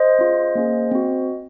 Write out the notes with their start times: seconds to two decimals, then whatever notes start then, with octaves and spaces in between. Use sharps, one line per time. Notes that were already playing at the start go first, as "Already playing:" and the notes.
Already playing: C5 D#5
0.19 C#4 F4 G#4
0.55 A#3 C#4 G#4
0.91 C4 F#4